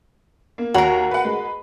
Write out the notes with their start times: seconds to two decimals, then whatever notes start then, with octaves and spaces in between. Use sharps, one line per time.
0.58 A#3
0.74 D#2 F#4 A#4 C#5 A#5
1.11 B4 F#5
1.25 G#3 B4